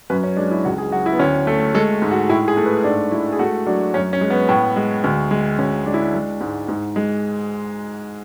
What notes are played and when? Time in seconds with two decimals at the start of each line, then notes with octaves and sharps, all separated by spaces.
0.10 F#2 B4
0.24 C#4
0.37 G#3 D4
0.51 E4
0.65 C#2 F#4
0.78 G#4
0.92 F#3 F#4
1.06 E4
1.13 B3
1.19 D2 C#4
1.47 A3
1.75 G#3 A4
2.02 G#2
2.11 F#4
2.29 A2 E4
2.48 G#4
2.57 A3
2.66 B4
2.84 G#2 D4
3.12 G#3 E4
3.32 G#4
3.39 A3 F#4
3.66 F#3 D4
3.94 F#2 C#4
4.13 C#4
4.21 G#3
4.30 B3
4.49 A2
4.76 G#3
5.04 D2
5.31 G#3
5.59 D2 C#4
5.86 G#3 D4
5.94 E4
6.01 D4
6.14 G#3
6.41 G#2
6.68 G#2
6.96 G#3